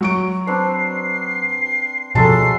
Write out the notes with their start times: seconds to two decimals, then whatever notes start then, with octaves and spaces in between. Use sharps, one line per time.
0.01 F#3 C#6 D7
0.47 C4 D4 B4 C7
2.15 B2 F3 F#3 G#3 G#4 A4 A5 C7